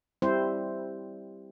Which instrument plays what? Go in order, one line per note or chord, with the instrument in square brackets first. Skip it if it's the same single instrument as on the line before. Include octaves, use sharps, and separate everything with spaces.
[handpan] G3 C4 E4 C5